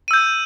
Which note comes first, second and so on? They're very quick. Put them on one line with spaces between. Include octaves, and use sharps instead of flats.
D#7 E6 G6